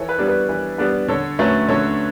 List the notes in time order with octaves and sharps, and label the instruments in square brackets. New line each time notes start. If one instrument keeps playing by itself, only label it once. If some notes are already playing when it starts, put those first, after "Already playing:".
Already playing: [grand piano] E3 A4 C#5
B4
G3 B3 D4
B4
E3 B4
G3 B3 D4 B4
D3 A4 C#5
F#3 A3 C#4 B4
D3 A4 C#5